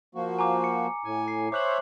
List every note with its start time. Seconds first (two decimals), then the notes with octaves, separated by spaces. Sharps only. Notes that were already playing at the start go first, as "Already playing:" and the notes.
0.15 F3 A#3 F#4
0.39 G#5 A#5 D6
0.64 C#7
1.05 A2 G#5
1.28 C7
1.52 C5 C#5 E5 D6 F#6 F#7